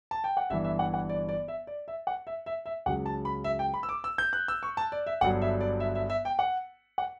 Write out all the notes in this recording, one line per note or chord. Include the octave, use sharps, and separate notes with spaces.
A5
G5
F#5
G1 G2 E3 E5
E5
F#5
F#5
D5
D5
E5
D5
E5
F#5
E5
E5
E5
C#2 C#3 F#3 F#5
A5
B5
E5
G5
B5
E6
D6
E6
G6
F#6
E6
C#6
A5
D5
E5
G1 G2 F#3 F#5
E5
D5
E5
E5
E5
G5
F#5
F#5